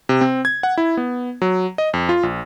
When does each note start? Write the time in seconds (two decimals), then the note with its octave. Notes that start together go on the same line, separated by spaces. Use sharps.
0.09 C3
0.21 C4
0.45 G#6
0.63 F#5
0.78 E4
0.97 B3
1.42 F#3
1.78 D#5
1.94 F2
2.09 F4
2.23 A#1